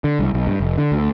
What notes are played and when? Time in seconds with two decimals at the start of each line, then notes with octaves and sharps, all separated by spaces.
0.04 D3
0.19 C2
0.34 B1
0.47 G2
0.60 F1
0.78 D3
0.92 D2